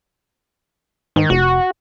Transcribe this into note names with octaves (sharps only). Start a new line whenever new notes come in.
G#2 D#3
F1 F#4